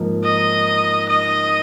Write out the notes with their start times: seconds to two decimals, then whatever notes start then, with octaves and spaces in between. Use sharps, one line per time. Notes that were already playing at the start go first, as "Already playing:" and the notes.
Already playing: G#2 F3 A#3
0.24 D#5
1.09 D#5